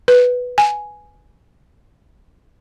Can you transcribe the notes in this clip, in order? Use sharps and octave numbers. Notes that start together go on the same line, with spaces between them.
B4
G#5